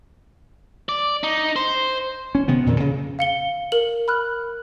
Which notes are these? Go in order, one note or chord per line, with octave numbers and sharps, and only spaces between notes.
D5
D#4
C5
C#4
C3 D#3 B3
F2 A#2
C#3
F5 C#7 G7
A#4 F#7
B5 F6 F#6